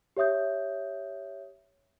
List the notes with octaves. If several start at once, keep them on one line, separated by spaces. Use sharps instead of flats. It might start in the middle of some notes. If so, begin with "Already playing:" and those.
G4 C#5 E5 D#6 G6